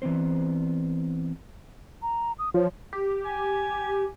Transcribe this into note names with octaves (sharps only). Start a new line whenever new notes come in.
E3 B3 C4 C5
A#5
D#6
F3 C#5
G4
G#5